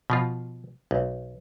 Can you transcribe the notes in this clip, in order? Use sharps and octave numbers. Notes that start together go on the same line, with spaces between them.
B2 F3 F4
B1